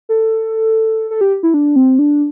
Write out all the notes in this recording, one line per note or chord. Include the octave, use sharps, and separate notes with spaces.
A4
A4
G4
E4
D4
C4
D4